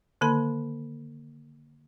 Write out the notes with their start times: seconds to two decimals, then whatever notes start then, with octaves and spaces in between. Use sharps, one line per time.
0.21 D3 D#3 A#3 B5